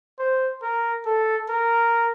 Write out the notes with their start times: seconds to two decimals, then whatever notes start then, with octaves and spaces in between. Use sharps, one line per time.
0.19 C5
0.63 A#4
1.06 A4
1.49 A#4